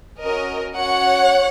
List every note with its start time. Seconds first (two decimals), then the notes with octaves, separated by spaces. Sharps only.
0.21 C#4 F#4 A#4 D#5
0.77 C#4 F#4 C#5 F#5